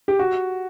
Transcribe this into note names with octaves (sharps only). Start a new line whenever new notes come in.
G4
F#4